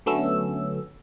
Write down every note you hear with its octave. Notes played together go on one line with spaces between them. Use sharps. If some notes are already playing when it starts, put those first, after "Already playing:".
D3 F#3 A3 B3 C#4 E6